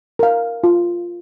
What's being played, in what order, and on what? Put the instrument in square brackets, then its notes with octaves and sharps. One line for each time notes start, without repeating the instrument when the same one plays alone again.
[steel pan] A#4 F5
F4